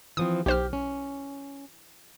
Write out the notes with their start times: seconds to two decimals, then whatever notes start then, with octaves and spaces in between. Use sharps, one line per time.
0.17 E3 F3 C4 D#6
0.46 B1 G4 C5 F6
0.73 C#4